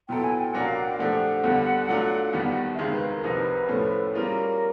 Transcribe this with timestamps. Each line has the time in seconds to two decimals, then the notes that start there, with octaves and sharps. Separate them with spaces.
0.09 A#2 F#3 B3 E4 A4 G5
0.24 G#5
0.38 G5
0.53 C2 A#2 F#3 A#3 D4 F#5
0.65 F5
0.76 F#5
0.87 G5
0.99 A#2 F3 A3 D4 G4 F#5
1.44 D#2 D3 G3 B3
1.89 F#3 A3 D4 F4
2.33 D#2 D#3 G3 B3
2.74 E5
2.78 C#2 C3 D#3 G#3 F5
2.93 B4
3.09 A#4
3.23 C2 C3 F3 A#3 D#4 B4
3.69 A2 F3 A3 C#4
4.13 G3 A#3 C#4 F4 G#4 A#4